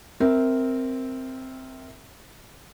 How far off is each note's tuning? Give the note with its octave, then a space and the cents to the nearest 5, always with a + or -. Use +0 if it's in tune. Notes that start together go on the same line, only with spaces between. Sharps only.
C4 +0 A#4 -5 E5 -15